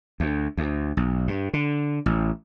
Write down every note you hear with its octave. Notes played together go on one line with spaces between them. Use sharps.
D2
D2
B1
G2
D3
A1